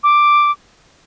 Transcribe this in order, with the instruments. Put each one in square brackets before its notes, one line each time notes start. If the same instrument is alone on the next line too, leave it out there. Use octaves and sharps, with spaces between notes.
[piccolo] D6